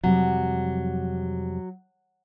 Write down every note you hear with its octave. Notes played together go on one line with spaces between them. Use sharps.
F2 C3 F#3 G3